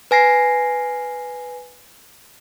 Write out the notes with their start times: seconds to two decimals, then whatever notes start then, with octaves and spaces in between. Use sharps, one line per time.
0.11 B4 G#5 A#6 C7